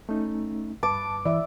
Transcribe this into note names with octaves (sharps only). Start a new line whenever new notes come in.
A3 C#4 D#4
G2 B4 A5 D6
E3 D5 E5